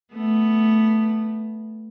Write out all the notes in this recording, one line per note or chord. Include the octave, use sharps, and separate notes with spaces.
A3 B3